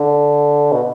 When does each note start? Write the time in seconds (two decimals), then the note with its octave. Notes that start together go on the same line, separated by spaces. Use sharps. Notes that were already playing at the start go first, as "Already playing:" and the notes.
Already playing: D3
0.72 B2